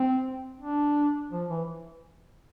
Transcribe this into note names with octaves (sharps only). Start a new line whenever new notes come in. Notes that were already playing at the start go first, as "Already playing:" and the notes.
Already playing: C4
D4
F3
E3